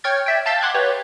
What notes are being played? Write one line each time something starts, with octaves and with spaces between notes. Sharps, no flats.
C#5 G5 F6 G#6 A6
D5 E5 G5
F5 A5 E6 G6 A6 B6
F#5 C6 D6 F#6 G#6
G4 B4 C#5